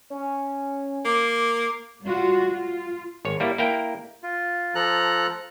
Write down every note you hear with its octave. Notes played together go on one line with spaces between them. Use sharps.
C#4
A#3 D6
G3 F4 F#4
F4
G#1 C#5
G3 A#3 E4
A#3 E4 A#4 G5
F4
F3 A4 A#5 F#6